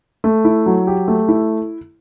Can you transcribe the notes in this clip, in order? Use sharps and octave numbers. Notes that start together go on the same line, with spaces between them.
A3
E4
F#3
G4
A3
E4